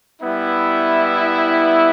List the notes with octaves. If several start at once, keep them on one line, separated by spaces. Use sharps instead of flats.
G3 B3 E4